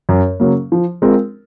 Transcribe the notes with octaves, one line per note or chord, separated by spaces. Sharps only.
F#2
C#3 F#3 A#3
F3
G#3 C4 F4 A#4